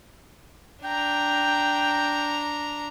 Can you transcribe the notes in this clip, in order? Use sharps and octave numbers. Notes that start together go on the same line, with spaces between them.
D4 G5 A#5